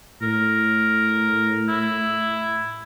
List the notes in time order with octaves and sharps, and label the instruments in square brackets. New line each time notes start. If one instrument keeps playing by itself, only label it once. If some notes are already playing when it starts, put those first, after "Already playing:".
[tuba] A2 [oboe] A#4
[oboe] E4